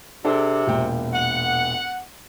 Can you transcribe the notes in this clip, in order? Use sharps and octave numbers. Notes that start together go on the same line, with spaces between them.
C3 D4 G#4 A4
E1 A#2 G5
F#5